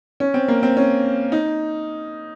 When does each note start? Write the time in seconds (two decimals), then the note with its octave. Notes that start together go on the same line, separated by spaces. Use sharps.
0.20 C#4
0.34 C4
0.48 A#3
0.63 C4
0.77 C#4
1.32 D#4